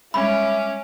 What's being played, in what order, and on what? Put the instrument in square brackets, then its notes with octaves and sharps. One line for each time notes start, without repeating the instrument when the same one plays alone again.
[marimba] G3 G#3 G#6 [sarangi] C#4 [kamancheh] E5 D6 [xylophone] B5